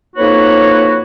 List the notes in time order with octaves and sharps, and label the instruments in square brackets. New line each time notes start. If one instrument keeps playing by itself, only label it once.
[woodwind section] F2 A#3 D#4 F#4 B4 C#5